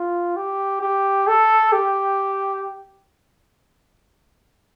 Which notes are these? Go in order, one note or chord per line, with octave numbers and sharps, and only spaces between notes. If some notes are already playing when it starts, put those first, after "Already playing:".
Already playing: F4
G4
G4
A4
G4